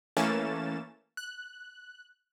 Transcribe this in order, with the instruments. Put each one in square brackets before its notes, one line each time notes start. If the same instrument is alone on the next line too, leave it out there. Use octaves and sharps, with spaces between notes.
[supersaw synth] E3 A3 A#3 C#4 A6 E7
F#6